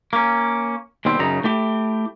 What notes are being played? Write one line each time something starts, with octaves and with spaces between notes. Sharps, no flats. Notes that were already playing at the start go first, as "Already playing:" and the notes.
A#3 C#4
D#2 B2 G3 C4
F#2 C#3 D#4 A#5
A3 E4 G4